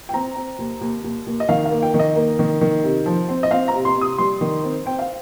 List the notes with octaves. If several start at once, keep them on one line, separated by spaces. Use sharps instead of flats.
G5
C4 A#5
C4
D#2
D#2
D#2
D#2
D#5
D#3 F5
F5
A#3
G5
D#3
D#5
A#3
D#3
D#3
C3
F3
C4
D#5
C4 F5
A#5
C3
C6
C3
D#6
G3 C6
D#3
C4
C4 G5
F5